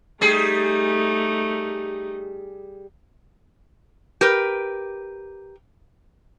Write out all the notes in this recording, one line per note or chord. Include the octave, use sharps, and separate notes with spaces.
G3 A3 D#4 G#4
G4 A#4 B4